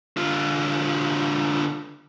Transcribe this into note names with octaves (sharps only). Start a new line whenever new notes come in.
D3 F4